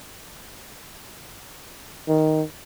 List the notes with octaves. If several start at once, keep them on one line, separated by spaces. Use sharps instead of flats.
D#3